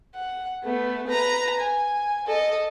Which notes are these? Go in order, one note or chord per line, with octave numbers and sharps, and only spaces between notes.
F#5
A3 B3
B4 A#5
G#5
A4 D#5